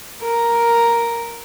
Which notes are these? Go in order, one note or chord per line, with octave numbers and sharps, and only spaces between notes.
A#4